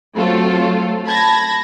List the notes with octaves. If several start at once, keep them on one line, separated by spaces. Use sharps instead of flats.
F#3 A3 C4 F4 A4
A5 B5 G#6 A#6